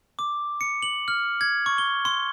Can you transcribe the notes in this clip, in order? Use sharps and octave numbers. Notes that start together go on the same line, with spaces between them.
D6
C#7
F#7
F6
G#6
C#6
G7
C6